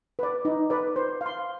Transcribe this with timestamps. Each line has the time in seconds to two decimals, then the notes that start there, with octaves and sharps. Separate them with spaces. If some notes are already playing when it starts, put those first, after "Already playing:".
0.19 B4 D5
0.45 D#4
0.70 B4 D5
0.96 C5
1.21 F5 C6